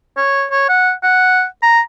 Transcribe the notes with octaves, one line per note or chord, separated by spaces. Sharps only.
C#5
C#5
F#5
F#5
A#5